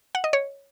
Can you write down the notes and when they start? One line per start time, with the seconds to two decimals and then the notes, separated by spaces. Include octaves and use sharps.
0.15 F#5
0.24 D#5
0.33 C#5